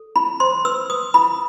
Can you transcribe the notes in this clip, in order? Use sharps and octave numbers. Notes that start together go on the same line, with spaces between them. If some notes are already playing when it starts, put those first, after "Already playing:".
Already playing: A4
E4 B5
C5 C6
B4 E6
B4 D#6
E4 B5